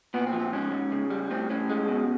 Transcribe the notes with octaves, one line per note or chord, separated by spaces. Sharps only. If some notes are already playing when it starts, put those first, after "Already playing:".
A#2 B3
C4
F3
C4
G#2 C#4
G#2
C#3
G3
A2 C4
A2 C#4
G#3
B2